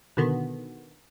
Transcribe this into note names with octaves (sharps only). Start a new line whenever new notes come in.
B2 D3 D#3 B3